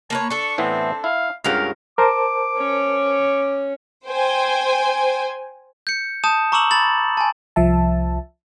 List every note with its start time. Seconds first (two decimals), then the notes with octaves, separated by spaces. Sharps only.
0.10 A#3 B4 C#5 A5
0.30 D4 A4 C#6
0.58 A2 E3 B3 C4
1.04 E4 F5
1.44 C#2 G2 C#3 F#4 G4 A#4 F5
1.98 A#4 C5 A5 D6
2.57 C#4 C#5
4.06 C5 G5 G#5
5.87 G6 C#7
6.24 A5 D#6 G6 E7
6.52 A#5 C#6 D6 E6 E7 F#7
6.71 B5 A6 F#7
7.17 G#5 A5
7.56 C2 F3 E5 A5